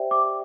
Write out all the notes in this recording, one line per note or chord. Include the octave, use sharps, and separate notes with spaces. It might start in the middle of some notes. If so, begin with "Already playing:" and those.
Already playing: G4 C5 D5 E5 G5
D6